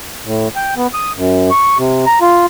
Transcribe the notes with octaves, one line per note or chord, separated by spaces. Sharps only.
A2
G5
B3
D#6
F#2
C#6
C3
A#5
F4